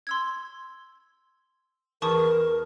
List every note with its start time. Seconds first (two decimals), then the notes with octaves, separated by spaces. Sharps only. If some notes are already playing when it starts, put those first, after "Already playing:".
0.07 C6 E6 G#6
2.02 E2 A#4 A5 C#6 D#6